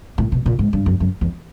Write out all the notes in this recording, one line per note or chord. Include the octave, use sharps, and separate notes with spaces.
A2
B2
A#2
G#2
G2
F#2
F#2
E2